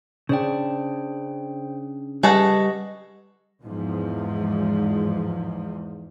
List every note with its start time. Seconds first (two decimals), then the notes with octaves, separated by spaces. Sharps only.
0.29 C#3 D4 C5 G5
2.23 G3 G#4 A4 B4 D#5 F#5 C#6
3.63 E2 G#2 F3